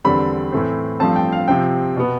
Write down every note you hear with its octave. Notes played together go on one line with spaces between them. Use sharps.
E2 D3 G3 C4 B5
A2 E3 A3 C4
G2 F3 A3 C4 A5
G5
F5
C3 F3 C4 G5
B2 B3